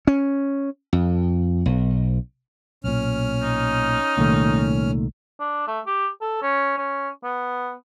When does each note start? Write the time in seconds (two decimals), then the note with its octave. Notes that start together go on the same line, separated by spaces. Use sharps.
0.07 C#4
0.93 F2
1.66 B1
2.84 B1 A#2 C#4 F6
3.43 D#4
4.17 C2 A#2 D#3 A3
5.40 D4
5.67 A3
5.87 G4
6.22 A4
6.42 C#4
6.78 C#4
7.24 B3